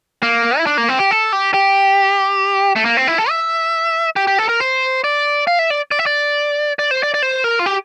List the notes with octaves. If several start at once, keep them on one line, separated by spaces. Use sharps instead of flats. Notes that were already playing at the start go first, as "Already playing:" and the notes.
A#3
E4
D4
A#3
C4
G4
A4
G4
G4
A3
A#3
C4
E4
A4
E5
G4
G4
A4
A#4
C5
D5
F5
E5
D5
D5
E5
D5
D5
C5
D5
D5
C5
A#4
F4
G4